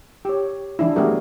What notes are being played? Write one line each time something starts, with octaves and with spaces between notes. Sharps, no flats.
G4 C#5
E3 D4 E4
G3 A3 B3 F#4 G#4 A#4